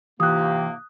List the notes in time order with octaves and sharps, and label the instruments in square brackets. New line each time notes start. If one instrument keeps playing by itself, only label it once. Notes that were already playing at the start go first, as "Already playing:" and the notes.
[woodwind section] G#2 C3 A#3 [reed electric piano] E3 [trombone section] F4 G4 [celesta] D#6 F#6